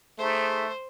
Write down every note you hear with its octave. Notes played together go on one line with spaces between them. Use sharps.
A3 D#4 G#4 C5 E5